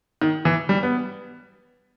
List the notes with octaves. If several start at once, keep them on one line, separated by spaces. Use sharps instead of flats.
D#3
E3
G3
B3